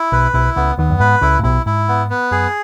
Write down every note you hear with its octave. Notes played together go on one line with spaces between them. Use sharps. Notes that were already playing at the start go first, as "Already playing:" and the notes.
Already playing: E4
B1 B2 B4
B1 B2 E4
C#2 C#3 B3
D#2 D#3 B3
F#2
G#2 B4
C#2 C#3 E4
A2
B1 B2 E4
G#2 E4
B3
B3
F#2 G#4